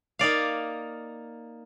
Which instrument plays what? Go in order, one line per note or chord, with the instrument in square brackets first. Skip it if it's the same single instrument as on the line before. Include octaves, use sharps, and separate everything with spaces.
[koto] A#3 D#4 D5 F5